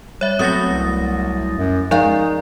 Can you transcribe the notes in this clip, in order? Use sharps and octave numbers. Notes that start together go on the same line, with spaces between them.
G3 C#5 E5
F#3 A3 B3 C4 D#6 A6 A#6
C2
F#2
F3 G#3 D#4 D5 F5